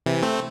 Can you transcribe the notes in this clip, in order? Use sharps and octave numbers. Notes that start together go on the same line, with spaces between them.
C3 E3
A3 C4